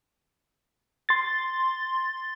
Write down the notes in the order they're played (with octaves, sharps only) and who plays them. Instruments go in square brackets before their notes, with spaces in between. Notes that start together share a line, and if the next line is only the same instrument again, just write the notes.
[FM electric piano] C6 A6